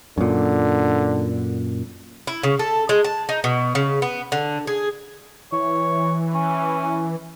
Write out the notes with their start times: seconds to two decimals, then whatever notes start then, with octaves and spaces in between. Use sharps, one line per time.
0.18 F#2 A#2 D3
2.27 E4
2.43 C#3
2.59 A4
2.89 G#3
3.04 A5
3.29 D#4
3.44 B2
3.75 C#3
4.02 B3
4.32 D3
4.67 G#4
5.52 E3 C#5
6.34 C#4